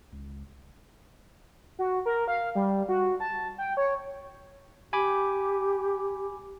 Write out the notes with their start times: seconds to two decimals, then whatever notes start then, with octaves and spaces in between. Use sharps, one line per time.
0.12 C#2
1.79 F#4
2.06 A#4
2.28 F5
2.55 G3
2.89 F#4
3.20 A5
3.58 G5
3.77 C#5
4.93 G4 G#5 B5 D6